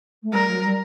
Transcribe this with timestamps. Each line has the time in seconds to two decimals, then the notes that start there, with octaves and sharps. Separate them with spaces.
0.22 A3
0.33 G3 A#4
0.47 F#3
0.63 G3